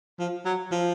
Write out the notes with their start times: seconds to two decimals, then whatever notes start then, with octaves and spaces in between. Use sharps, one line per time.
0.19 F3
0.45 F#3
0.71 F3